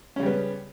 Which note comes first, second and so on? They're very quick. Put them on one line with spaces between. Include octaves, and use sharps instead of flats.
C#4 C#3 G3 B3